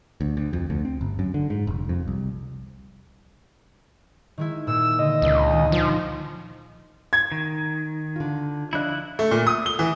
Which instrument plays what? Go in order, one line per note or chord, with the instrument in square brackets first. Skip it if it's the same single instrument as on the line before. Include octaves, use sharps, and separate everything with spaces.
[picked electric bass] D2
D2
F2
D2
C4
G1
F#2
D3
G#2
F1
F2
C2
[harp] D#3 G#3 E4
[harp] A#2 [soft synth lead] E6
[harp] D3 [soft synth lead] D#5
[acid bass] C#2
[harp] D#3
[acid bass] F3
[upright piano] G#6
[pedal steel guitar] D#3
[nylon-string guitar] D3 F4
[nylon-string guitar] F3 D4 D#5 [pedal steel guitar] E4 F#6
[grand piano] A3
A#2
D#6
G7
E3